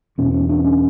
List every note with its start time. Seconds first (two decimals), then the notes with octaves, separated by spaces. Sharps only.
0.18 E2 B2 C#4
0.34 C#4
0.49 D4
0.64 C#4